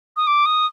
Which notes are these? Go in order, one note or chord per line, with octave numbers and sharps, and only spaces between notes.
D#6
D6
D#6